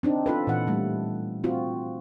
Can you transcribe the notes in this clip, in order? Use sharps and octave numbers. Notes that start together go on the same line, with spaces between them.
C4 D4 D#4
F4 A4 B4
A#2 E3 F#5
G3 A3
C4 F4 F#4